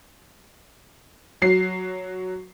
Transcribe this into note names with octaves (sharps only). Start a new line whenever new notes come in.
F#3 C7